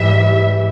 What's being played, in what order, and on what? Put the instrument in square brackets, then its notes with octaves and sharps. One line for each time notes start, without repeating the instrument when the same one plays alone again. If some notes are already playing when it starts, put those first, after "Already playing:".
Already playing: [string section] G#2 E3 G3 E5